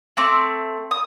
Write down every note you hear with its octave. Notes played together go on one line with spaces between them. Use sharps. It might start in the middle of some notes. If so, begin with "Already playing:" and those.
A3 C4 D6
D#6